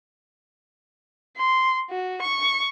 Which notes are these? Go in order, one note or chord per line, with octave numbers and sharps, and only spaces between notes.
C6
F#4
C#6